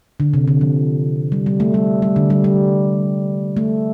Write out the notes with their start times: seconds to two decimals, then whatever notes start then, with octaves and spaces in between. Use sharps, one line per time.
0.20 D3
0.34 C3
0.48 D3
0.61 F3
1.32 G3
1.46 G3
1.60 A3
1.74 G3
2.02 G3
2.16 D3
2.30 G3
2.44 G3
3.57 A3